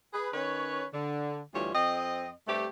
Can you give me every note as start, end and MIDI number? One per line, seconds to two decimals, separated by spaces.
0.14 0.29 68
0.14 0.29 71
0.34 0.85 51
0.34 0.85 61
0.34 0.85 71
0.34 0.85 73
0.93 1.42 50
1.54 1.73 38
1.54 1.73 52
1.54 1.73 55
1.54 1.73 65
1.54 1.73 73
1.74 2.32 41
1.74 2.32 60
1.74 2.32 75
2.48 2.68 43
2.48 2.68 57
2.48 2.68 60
2.48 2.68 67